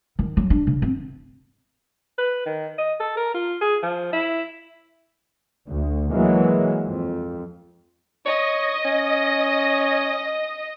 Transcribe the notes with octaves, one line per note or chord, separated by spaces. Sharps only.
D#3
F#3
D4
C#3
C4
B4
D#3
D#5
A4
A#4
F4
G#4
F3
E4
D2
E3 F#3 G#3 A#3
F2
C#5 D#5
C#4